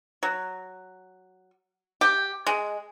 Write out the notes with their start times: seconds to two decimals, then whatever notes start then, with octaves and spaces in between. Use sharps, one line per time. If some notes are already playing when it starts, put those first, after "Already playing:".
0.23 F#3
2.01 G4
2.47 G#3